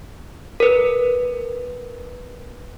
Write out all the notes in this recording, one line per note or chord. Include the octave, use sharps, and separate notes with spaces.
A#4 B4